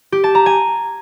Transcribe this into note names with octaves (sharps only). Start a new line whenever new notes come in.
G4
A5
A#5
G#5